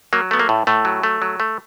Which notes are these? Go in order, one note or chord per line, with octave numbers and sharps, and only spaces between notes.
F#3 A#3
A3 B3
A#3
A2
A2 A3
F#3
A3
F#3
A3